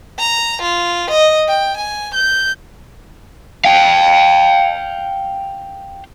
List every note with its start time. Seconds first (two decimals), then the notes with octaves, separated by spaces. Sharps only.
0.19 A#5
0.62 F4
1.11 D#5
1.48 G5
1.77 G#5
2.15 G6
3.65 F5 G5